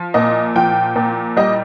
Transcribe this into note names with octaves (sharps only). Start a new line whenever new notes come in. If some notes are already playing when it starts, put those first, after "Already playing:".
Already playing: F3
A#2 D#5
F3 G5
A#2
G3 D#5